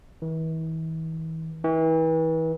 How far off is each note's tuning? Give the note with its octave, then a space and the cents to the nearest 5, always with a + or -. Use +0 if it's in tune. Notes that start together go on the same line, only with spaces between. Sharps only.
E3 -40
E3 -35